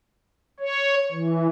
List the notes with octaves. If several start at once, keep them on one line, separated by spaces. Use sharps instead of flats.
C#5
E3